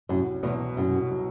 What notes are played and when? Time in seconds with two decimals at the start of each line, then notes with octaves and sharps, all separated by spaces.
0.09 C2 F#2
0.43 E2 B2 F#3
0.77 C2 F#2
1.10 B2 F#3